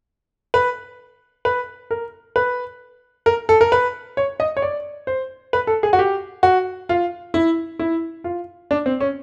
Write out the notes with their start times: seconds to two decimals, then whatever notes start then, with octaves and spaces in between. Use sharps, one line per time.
0.54 B4
1.45 B4
1.91 A#4
2.36 B4
3.26 A#4
3.49 A4
3.61 A#4
3.72 B4
4.17 C#5
4.40 D#5
4.57 C#5
4.62 D5
5.07 C5
5.53 B4
5.67 A4
5.83 G#4
5.93 F#4
5.99 G4
6.43 F#4
6.89 F4
7.34 E4
7.79 E4
8.24 F4
8.71 D4
8.86 C4
9.00 C#4